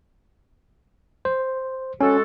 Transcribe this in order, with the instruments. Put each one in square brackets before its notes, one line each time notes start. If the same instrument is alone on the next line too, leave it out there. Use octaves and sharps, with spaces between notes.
[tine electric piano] C5
[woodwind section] G#3 F#4 A4 [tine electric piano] C#4